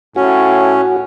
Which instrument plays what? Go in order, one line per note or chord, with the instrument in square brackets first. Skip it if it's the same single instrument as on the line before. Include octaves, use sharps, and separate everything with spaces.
[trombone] A2 [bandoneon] C#4 [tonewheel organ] F#4